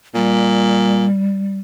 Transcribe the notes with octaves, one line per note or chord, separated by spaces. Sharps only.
A#2 G3